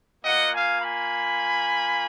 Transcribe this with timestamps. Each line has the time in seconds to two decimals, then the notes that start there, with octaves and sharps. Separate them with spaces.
0.24 A#3 F4 D#5 F#5
0.53 F5 G#5
0.82 G#5 B5